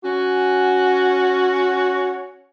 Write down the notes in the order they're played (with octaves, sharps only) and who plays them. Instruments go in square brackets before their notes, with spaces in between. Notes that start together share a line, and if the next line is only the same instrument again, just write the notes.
[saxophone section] C#4 F#4